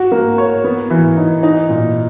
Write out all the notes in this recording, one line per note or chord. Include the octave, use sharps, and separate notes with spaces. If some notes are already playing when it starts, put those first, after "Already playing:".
Already playing: F#4
A#3
C#5
B3
E3
D#4
D#4
A#2